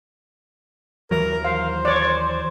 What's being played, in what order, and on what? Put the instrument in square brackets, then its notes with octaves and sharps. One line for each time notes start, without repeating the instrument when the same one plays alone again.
[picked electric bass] D#2 E3 F#3 [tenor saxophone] A#4
[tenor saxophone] C5 [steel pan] F5
[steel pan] C#5 D5